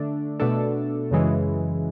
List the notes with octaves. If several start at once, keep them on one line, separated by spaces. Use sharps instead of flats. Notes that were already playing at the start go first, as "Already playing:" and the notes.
Already playing: D3 A3 D4
B2 A3 D4 A4
F#2 C#3 E3 G#3